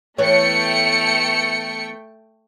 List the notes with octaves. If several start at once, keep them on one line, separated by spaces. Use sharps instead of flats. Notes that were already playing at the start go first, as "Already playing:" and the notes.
E3 A3 B3 C#5 G5 C#7